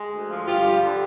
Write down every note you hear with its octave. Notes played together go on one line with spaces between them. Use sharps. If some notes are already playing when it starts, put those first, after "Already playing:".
Already playing: G#3
D2
F3
G2 F4 G4
G3
D3